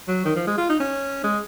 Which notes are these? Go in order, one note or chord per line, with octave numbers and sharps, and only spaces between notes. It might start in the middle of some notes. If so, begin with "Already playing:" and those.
F#3
D#3
F3
G#3
F4
D#4
C#4
G#3